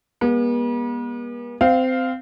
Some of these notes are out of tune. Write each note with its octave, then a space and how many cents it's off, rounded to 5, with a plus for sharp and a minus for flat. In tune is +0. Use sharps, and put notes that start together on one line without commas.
G#3 -40 B3 -45
C4 -20 F5 +0